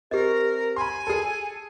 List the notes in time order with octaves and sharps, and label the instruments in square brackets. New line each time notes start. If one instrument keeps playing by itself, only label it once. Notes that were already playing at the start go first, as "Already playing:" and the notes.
[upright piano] C4 [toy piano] G4 D#5 [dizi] A#4
[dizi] G#5 [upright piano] B5 C6
[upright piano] G#4 A4